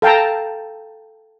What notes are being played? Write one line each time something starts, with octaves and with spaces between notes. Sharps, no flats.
A4 F5 G5 A5 A#5